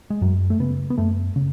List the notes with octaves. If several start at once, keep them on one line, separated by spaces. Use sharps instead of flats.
G#3
F#2 F#3
A3
C#3 B3
B3
F#2 A3
C#3